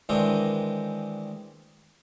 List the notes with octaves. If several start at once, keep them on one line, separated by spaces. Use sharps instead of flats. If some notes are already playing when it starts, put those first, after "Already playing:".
D#3 E3 G#3 C4 D4 A#4